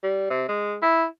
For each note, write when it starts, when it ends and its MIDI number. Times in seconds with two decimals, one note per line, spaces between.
0.03 0.28 55
0.30 0.49 48
0.49 0.77 56
0.82 1.05 64